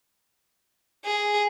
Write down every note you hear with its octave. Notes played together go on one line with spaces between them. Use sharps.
G#4